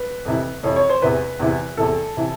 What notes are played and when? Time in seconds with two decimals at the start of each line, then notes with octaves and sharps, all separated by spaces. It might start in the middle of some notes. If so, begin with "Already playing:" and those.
Already playing: B4
0.25 F2 C3 E3
0.63 F2 C3 E3 C#5
0.76 C#5
0.89 C5
1.02 E2 C3 E3 B4
1.39 E2 C3 E3
1.77 E2 C3 E3 A4
2.17 C3 E3